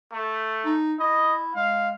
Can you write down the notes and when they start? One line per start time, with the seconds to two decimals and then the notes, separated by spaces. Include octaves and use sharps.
0.13 A3
0.65 D#4
0.99 E4 D#5
1.56 G#3 F5